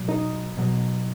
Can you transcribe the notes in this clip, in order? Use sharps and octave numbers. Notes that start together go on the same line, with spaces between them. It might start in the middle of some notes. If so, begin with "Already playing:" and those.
Already playing: B2 F#3
D#4 D#5
B2 F#3